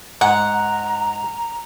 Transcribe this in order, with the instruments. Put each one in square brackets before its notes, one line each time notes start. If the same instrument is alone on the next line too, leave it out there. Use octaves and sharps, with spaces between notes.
[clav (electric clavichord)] G#2 [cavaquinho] F#5 [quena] A#5